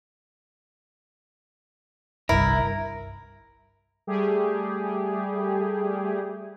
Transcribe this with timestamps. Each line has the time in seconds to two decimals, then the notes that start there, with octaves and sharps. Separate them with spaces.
2.29 G1 C2 G2 E4 A#4
4.07 G3 A3 G4 G#4